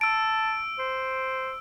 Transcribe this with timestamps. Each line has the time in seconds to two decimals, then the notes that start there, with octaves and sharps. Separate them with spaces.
0.01 A5 E6 D7
0.79 C5